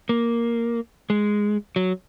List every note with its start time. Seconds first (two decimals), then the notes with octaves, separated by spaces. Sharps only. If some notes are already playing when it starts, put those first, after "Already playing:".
0.09 A#3
1.10 G#3
1.76 F#3